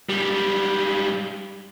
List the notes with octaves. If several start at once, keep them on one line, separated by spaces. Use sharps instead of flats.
G#2 G3